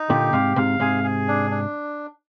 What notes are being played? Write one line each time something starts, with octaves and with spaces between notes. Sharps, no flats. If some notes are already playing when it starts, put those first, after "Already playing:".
Already playing: D#4
A#2 D3 G4
G#2 C3 F5
G#2 C3 F5
G#2 C3 G#4
G#4
D4
D4